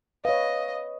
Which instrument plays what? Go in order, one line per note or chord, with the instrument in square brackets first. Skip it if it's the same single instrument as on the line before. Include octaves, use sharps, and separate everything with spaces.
[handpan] B4 C#5 [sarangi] D#5 [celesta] F5